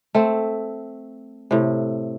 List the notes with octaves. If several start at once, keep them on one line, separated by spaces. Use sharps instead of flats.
A3 C4
A2 C3